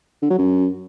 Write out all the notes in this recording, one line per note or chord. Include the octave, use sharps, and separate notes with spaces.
D3
F#3
F#2